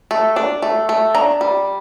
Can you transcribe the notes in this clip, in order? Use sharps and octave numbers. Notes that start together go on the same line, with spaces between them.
A3
D4
A3
A3
D4 A#5
G3